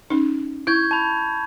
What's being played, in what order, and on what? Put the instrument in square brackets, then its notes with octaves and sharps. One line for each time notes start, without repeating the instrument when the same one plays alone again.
[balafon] C#4 D#4
[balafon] E4 [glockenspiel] C#6 G6 G#6
[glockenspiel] A5 B5